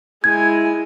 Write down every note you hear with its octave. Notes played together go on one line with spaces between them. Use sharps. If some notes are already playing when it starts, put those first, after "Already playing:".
G#3 E4 G#5 G#6